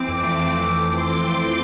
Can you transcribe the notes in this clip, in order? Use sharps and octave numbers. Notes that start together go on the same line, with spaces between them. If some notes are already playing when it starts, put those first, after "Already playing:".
Already playing: E3 C4 D6
F2
A3
C4
E3
F2
A3
C4 C6
E3
F2
A3